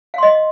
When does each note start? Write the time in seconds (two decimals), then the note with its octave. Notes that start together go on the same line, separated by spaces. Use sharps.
0.14 F5
0.18 C6
0.23 D#5